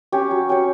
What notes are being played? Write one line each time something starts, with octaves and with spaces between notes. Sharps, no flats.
C#4 G4 C#5
F#3
C#4 G4 C#5